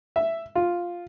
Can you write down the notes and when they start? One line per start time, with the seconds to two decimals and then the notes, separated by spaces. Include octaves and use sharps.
0.16 E5
0.56 F4